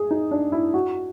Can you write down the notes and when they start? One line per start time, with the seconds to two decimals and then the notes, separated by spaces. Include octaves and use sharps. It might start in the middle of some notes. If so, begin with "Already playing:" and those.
Already playing: G#4
0.11 D#4
0.31 D4
0.52 E4
0.74 F#4